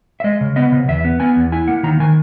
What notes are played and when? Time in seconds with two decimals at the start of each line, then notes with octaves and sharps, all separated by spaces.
0.20 E5
0.24 G#3 D#5
0.41 C#3
0.56 B3 D#5
0.72 C#3
0.88 E2 E5
1.05 B3
1.20 B3 G#5
1.36 E2
1.52 E4 G#5
1.68 A#3 F#5
1.83 D#3 A#5
2.00 D#3 G#5